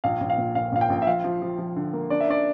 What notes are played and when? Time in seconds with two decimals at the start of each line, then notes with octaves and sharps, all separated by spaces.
0.04 A#1 F5
0.21 A#1
0.30 F5
0.38 A#2
0.55 A#1 F5
0.72 A#1 F5
0.81 G5
0.90 A#1
1.02 E5
1.07 F3 F5
1.24 F3
1.42 F3
1.58 F3
1.76 D3
1.93 A#3
2.10 D4 D5
2.20 E5
2.28 D4 D5